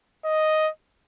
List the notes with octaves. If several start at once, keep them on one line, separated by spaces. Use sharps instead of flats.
D#5